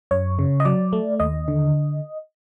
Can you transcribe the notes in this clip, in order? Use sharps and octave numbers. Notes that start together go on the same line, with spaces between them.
F#2 C#5
C#3
D#5
F#3 D5
A3
D#2 D#5
D3